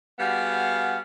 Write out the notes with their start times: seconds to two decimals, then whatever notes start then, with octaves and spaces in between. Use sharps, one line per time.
0.19 G3 B3 F#4 G#4 F5